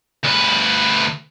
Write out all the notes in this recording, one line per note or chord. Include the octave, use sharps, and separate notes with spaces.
D2 B4